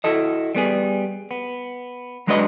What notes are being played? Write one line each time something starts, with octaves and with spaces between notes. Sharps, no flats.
E4 F#4 A4 D#5
G3 B3 G#4
B3
F#3 G#3 D4 F#4 B4 D#5